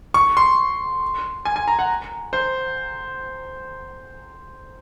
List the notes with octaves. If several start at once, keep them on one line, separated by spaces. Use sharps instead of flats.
C#6
C6
G#5
G#5
A#5
F#5
C5